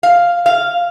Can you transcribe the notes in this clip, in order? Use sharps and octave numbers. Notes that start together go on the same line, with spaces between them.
F5
F5